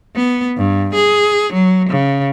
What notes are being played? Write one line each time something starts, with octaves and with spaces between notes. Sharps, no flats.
B3
G2
G#4
F#3
C#3